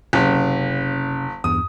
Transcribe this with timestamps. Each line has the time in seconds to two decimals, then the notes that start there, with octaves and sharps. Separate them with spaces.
0.13 F#1 C3 C#4
1.44 E2 G2 D#6